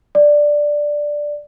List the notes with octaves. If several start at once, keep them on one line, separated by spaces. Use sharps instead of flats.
D5